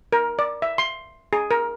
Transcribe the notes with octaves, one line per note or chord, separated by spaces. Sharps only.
A#4
D5
E5
C6
G#4
A#4